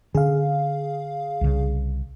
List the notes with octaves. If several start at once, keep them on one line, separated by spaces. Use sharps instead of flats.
D3 C#4 G#4 F5
C2 C#3